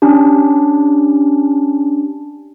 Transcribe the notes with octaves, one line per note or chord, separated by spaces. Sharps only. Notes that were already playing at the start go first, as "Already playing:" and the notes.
C#4 D4 G4